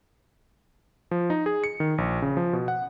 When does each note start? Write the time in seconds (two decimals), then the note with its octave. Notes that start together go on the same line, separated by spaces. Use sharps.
1.11 F3
1.30 D#4
1.46 G#4
1.64 C#7
1.80 D#3
1.98 A#1
2.22 C#3
2.37 F3
2.53 B2
2.68 F#5